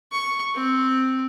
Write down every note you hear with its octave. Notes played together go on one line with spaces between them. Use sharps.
C#6
C4